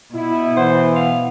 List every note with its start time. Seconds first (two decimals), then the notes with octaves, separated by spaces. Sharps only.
0.15 B2 E4
0.57 E3 C5 F#5
0.96 F5